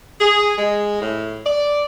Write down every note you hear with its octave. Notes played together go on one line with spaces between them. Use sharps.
G#4
G#3
A2
D5